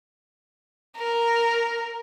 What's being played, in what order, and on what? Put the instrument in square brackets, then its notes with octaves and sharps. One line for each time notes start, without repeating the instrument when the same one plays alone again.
[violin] A#4